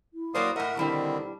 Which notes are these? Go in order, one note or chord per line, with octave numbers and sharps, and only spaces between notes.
E4
F#3 A#3 C5 D5 F5 D#6
A2 A#4 D#5 E5 F#5
B2 D3 D#3 G3 C4 D4 E4